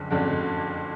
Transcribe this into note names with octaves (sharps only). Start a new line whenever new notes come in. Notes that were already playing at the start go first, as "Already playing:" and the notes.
Already playing: F#1 F2 D3
F#1 F2 D3